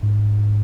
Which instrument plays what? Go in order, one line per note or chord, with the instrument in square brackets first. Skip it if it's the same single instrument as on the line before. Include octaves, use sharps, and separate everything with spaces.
[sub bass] G#2